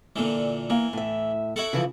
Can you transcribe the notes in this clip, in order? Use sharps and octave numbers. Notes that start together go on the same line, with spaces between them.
A#2 D3 E3
E3 A#3
A2 E5
E4 F#4 A4
C#3 E3 F3